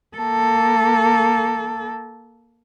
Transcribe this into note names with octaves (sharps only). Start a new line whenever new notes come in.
A#3 A4